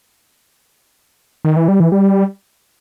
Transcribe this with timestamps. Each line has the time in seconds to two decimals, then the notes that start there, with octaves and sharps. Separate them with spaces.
1.45 D#3
1.56 E3
1.68 G3
1.80 E3
1.92 G3